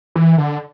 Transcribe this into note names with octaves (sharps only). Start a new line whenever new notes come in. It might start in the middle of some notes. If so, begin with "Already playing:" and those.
E3
D3